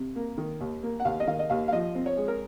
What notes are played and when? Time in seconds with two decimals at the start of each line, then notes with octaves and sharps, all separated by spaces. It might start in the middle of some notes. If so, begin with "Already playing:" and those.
Already playing: C3
0.16 A#3
0.38 D#3
0.61 D#2
0.83 A#3
1.00 F#5
1.05 D#2 F5
1.20 D#5
1.27 D#3 F5
1.39 D#5
1.50 D#2 F5
1.68 F5
1.72 F3 D#5
1.95 C4
2.06 C#5
2.17 G#3
2.28 A#4